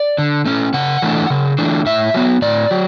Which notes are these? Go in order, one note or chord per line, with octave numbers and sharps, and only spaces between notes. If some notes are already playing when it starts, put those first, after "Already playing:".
Already playing: D5
D3
A3 C#4
C#3 F#5
E3 A3 D4
C#3
E3 A3 D4
A2 E5
F#3 B3
A2 D5
F#3